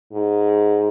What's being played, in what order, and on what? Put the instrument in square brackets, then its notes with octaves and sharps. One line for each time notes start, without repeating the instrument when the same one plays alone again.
[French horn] G#2